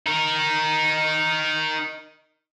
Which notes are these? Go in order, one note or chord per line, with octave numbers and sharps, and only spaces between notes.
D#4 A#4